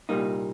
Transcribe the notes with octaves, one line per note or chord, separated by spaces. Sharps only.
C2 A#2 G3 A#3 D#4